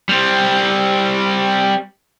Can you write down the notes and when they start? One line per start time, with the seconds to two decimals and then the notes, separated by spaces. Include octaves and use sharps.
0.09 G3 C4